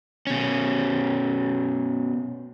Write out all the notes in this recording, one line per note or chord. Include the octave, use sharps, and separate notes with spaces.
B2 C#4